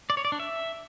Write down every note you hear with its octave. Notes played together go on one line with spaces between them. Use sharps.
D5
C#5
D5
D4
E5